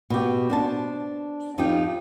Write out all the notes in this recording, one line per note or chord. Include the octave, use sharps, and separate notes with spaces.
B2 G4
D4 C5 A5
F2 F3 D#4 F4 G4 G5